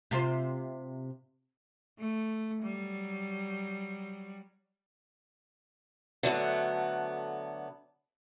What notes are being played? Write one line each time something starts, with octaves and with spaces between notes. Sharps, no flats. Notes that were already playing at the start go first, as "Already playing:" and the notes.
C3 F4 C5
A3
F#3 G3
D3 F#3 A3 B3